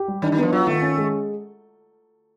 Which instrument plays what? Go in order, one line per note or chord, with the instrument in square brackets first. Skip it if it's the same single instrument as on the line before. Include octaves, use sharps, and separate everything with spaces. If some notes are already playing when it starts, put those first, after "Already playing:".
Already playing: [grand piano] G4
G3
[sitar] D#3 [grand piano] D4
[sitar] D#3
[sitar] F3 [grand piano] B3
[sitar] F#3 [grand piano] F4
[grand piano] D#3 [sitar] A3
[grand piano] C#4
G#3